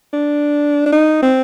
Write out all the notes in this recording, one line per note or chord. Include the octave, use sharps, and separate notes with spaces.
D4
D4
D#4
C4